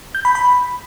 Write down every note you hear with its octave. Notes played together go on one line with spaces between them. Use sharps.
G6
B5
B5